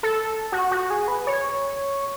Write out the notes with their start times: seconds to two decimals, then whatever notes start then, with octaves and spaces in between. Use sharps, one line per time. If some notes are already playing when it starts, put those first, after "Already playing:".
0.03 A4
0.52 F#4
0.71 F#4
0.90 G#4
1.08 B4
1.27 C#5